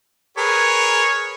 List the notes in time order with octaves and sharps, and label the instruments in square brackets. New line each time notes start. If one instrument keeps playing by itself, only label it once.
[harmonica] G#4 A#4 B4 [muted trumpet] C#5